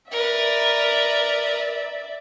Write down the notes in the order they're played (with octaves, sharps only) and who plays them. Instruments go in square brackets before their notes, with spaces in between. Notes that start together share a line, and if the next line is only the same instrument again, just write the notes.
[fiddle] A#4 B4 [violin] D5 E5